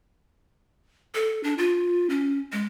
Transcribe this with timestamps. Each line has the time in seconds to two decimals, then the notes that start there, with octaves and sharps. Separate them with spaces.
1.15 A4
1.43 D4
1.58 F4
2.10 C#4
2.53 G#3